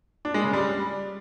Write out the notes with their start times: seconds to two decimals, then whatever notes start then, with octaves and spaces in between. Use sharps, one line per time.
0.25 D4
0.34 G#3
0.44 C#3
0.53 G3